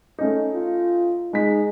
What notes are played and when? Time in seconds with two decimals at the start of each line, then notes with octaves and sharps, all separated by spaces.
0.18 A3 C#4 D#4
0.54 F4
1.33 G#3 D#4 B6